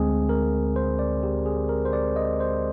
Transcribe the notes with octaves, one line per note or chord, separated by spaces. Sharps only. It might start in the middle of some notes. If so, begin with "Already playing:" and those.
Already playing: D2 D3 G#3 C4 G#4
A#4
C5
D5
G4
G#4
A#4
C5
D5
D#5
C5